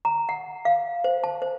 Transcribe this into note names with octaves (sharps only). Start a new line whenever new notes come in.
A#5
F#5
F5
C5
A5
C5